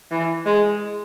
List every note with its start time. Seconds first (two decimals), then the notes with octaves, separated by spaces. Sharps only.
0.11 E3
0.46 G#3